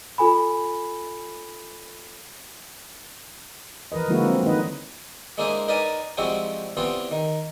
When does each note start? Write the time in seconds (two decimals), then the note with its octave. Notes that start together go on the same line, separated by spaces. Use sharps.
0.18 F4 A4 G#5 B5
3.92 E3 A#4 B4 D#5
4.08 D3 F3 G#3 A#3 E4 F#4
4.24 D3 F#3 C4
4.43 D#3 A3 D#4 B4 D#5
5.38 G#3 A#3 D4 E4 G#4 C5
5.68 D#4 A#4 B4 D5 G#5 A5
6.17 F3 G3 G#3 C4 E4 F#4
6.77 E3 G3 B3 C4 F4
7.11 D#3